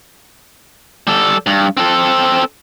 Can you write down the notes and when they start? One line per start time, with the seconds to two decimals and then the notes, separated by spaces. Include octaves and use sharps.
1.07 G3 A4
1.46 G2
1.77 C4 A4